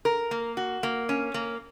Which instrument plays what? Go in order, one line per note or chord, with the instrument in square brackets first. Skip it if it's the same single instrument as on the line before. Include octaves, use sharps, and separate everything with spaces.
[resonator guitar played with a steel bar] A#4
A#3
F#4
A#3
C#4
A#3